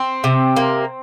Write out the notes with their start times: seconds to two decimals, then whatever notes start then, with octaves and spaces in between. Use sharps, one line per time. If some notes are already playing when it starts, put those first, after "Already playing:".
Already playing: C4
0.24 C3
0.56 A#3